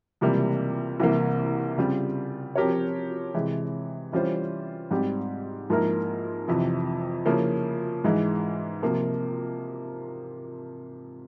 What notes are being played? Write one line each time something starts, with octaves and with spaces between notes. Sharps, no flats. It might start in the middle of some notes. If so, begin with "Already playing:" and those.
C#2 C3 E3 G3 A#3
C2 C3 E3 A#3
C#3 G3 C4 F4
F3 C4 G4 A#4 C#5
C3 E3 G#3
E3 G3 C#4 F4 C5
G#2 G3 C4 G4
G#2 F3 A#3 E4 A#4
F2 C3 E3
C#3 F3 A#3 C#4 E4
G#2 E3 G#3
C3 F3 A#3